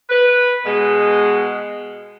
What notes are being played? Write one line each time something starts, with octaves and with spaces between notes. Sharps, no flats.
B4
B2 G#3